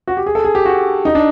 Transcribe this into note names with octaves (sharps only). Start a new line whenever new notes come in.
F#4
G4
G#4
A4
G#4
G4
F#4
D#4
D4